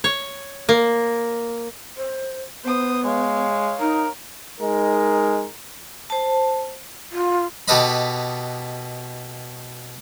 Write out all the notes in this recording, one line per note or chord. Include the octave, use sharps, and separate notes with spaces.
C#5
A#3
C5
B3 C5 D#6
G#3 C#5 F5
D#4 A#4
G#3 D#4 A#4
C5 A5
F4
B2 G4 A4 B4 D#5 B5